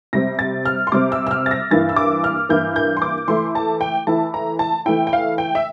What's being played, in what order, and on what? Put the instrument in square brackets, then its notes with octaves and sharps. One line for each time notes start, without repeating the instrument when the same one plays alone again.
[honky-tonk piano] C3 G3 C4 A#6
A6
F6
C6
C3 G3 C4 D6
E6
E6
F6
A6
A#6
G2 E3 A#3 E4 A6
E6
D6
F6
G2 E3 A#3 E4 G6
G6
C6
D6
E3 A3 E4 C6
A5
G5
E3 A3 E4 A5
A#5
A5
E3 A3 E4 G5
G5
F5
G5
E5